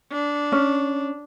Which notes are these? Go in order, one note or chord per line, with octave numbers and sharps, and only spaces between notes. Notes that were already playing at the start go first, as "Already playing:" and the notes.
D4
C#4